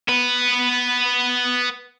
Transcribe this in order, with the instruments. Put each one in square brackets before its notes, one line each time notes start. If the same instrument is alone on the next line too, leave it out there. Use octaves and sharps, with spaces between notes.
[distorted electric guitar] B3 B4